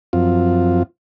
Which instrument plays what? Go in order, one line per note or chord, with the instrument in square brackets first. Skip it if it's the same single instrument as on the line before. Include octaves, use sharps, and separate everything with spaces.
[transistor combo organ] F#2 F3 C4 F4